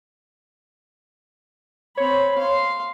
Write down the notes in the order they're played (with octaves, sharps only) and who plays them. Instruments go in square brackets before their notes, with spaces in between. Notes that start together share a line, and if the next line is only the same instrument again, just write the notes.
[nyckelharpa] C4 B5 [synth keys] C#5
[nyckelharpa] F5 C6